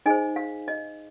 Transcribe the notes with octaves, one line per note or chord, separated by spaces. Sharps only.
D#4 G#4 C5 D#5 G#5
F5
D#5